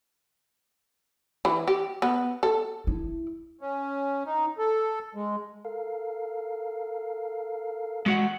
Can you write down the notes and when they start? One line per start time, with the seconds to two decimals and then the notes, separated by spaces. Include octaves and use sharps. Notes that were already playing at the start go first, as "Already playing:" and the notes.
1.45 E3
1.68 G4
2.02 B3
2.43 A4
2.87 E4
3.61 C#4
4.26 D#4
4.58 A4
5.15 G#3
5.65 A4 A#4 F5
8.06 G#3 F#4 F#5 G6